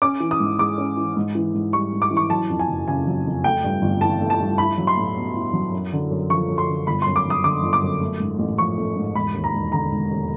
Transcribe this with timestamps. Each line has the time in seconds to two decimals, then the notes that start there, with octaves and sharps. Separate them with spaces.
0.02 C#4 D6
0.20 E3
0.31 D#6
0.40 G#2
0.59 G#3 D6
0.78 C#4
0.97 E3
1.17 G#2
1.35 E3
1.54 G#2
1.73 G3 C#6
1.93 G#2
2.02 D6
2.11 E3
2.17 C#6
2.30 F#3 A5
2.50 F2
2.59 G#5
2.68 F#1
2.88 C#3 G#5
3.07 F#3
3.26 F2
3.44 A3 G5
3.64 G2
3.82 G1
4.01 E3 A5
4.21 A3
4.30 A5
4.40 G2
4.58 E4 B5
4.78 F#3
4.87 C6
4.97 A2
5.16 B3
5.35 E4
5.53 F#3
5.72 F#2
5.93 D3
6.10 F#2
6.30 F3 C#6
6.49 F#2
6.58 C6
6.68 D3
6.87 G1 B5
7.02 C6
7.07 F#2
7.16 D6
7.25 G1 D#6
7.44 D3 D6
7.63 G1
7.73 D6
7.83 F#2
8.01 A3
8.20 G#2
8.39 A1
8.58 F3 C#6
8.78 A3
8.96 G#2
9.15 E1 B5
9.34 D#2
9.44 A#5
9.53 E1
9.72 D3 A#5
9.92 E1
10.11 D#2